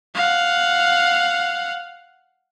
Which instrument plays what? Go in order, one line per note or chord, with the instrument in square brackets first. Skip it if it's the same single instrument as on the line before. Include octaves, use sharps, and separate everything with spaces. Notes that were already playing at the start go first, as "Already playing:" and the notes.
[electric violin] F5 F#5